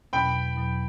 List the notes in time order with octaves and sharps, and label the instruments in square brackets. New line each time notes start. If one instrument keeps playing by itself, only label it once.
[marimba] E2 B2 F#3 [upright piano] G5 B5
[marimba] E2 B2 F#3